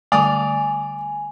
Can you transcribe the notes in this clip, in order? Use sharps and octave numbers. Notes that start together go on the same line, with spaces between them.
D3 G3 A3 D5 G#5 D#6